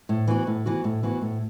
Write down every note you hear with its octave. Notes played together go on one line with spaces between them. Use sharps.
A2
E3 B3 F#4
A2
E3 B3 F#4
A2
E3 B3 F#4
A2